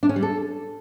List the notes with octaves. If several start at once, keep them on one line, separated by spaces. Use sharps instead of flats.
D4
C#4
G3
A4